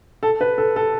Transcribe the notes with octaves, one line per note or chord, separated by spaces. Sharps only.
A4
B4
A4
A4